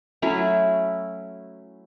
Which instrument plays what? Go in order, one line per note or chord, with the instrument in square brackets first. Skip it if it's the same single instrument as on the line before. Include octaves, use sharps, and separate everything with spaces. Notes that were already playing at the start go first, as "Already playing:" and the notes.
[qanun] F#3 A3 C#4 E4